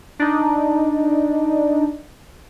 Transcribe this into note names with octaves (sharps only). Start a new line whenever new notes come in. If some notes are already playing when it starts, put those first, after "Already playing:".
D4 D#4